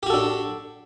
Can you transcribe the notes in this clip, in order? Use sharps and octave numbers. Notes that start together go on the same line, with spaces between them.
D4 F#4 G4 A4